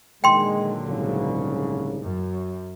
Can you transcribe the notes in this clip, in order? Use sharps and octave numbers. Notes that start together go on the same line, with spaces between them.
A#2 D3 D#3 F#3 G#3 G5 C6
C2 G#2 C#3
F#2